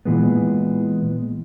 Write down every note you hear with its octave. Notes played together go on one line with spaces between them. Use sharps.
A#2 E3 G#3 B3